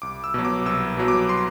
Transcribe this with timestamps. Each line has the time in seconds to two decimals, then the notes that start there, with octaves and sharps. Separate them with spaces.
0.02 C2 D6
0.24 E6
0.34 B2 F#3
0.45 D6
0.66 C2 E6
0.97 B2 F#3
1.08 D6
1.29 C6